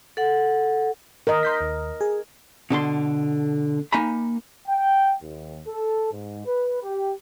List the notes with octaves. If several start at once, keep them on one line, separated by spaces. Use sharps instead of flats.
A4 F#5
D#3 A#4 D#5
C6 G6 B6
D#2
G#4
B2 D3 A4 C6
A#3 D#4 G#5 A#5 B5
G5
D#2
A4
G#2
B4
G4